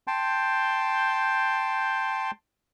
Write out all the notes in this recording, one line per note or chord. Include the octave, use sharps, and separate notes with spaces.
G5 A5 C6 G6